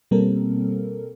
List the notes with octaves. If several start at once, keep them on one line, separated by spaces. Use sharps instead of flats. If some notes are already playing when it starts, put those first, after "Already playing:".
B2 G3 A#3 C4 A4 A#4